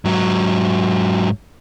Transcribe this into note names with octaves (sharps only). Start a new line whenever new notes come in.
G#2 F#3